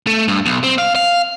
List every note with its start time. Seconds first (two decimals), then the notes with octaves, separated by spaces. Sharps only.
0.07 A3
0.28 G2
0.46 B1
0.64 C4
0.78 F5
0.95 F5